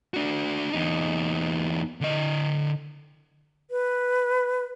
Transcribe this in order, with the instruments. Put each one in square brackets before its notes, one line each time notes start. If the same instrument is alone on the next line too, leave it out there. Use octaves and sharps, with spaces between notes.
[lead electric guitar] D4 F#4
E2 D#4
D3 D#5
[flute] B4